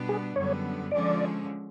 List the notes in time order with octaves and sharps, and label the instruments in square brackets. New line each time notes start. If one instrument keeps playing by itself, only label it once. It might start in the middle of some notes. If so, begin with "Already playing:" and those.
Already playing: [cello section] B2 G3 B3 D4
[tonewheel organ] G#4
[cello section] F#2 D3 G3 B3 [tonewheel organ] C#5
[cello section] D3 F3 G#3 C#4 [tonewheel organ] D5